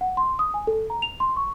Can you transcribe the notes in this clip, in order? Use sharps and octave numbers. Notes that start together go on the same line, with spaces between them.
F#5
C6
D#6
G#5
A4
A#5
F7
C6
C#6